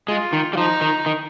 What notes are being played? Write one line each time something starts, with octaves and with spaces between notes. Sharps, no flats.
G#3 F4
D#3
G3
F3 D#4
D#3
D#3